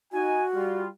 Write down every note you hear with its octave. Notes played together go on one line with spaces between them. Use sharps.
D#4 F#4 G#5
G3 F4